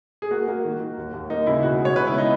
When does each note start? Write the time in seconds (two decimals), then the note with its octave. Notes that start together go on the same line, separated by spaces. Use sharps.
0.22 G#4
0.31 A#3 F#4
0.48 A#3
0.65 D#3
0.80 D#3
0.97 D#2
1.14 D#2
1.30 A#3 D#4
1.47 C#3 E4
1.62 B2 F#4
1.79 G#3
1.85 C#5
1.95 C#3 B4
2.07 E4
2.12 B3
2.18 D#4